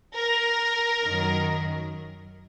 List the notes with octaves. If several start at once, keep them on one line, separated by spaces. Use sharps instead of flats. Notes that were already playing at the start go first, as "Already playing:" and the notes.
A#4
F#2 D#3 F#3